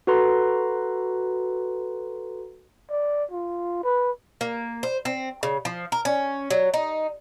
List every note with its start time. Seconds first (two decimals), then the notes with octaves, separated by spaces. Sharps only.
0.07 F#4 A4 B4 A#5 C6
2.91 D5
3.31 F4
3.84 B4
4.41 A#3
4.83 C5
5.05 C4
5.43 C#3
5.65 F3
5.92 A#4
6.05 C#4
6.50 F#3
6.74 D#4